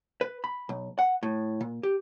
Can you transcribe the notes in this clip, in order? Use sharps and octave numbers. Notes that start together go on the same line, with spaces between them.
B4
B5
B1
F#5
A2
A#2
G4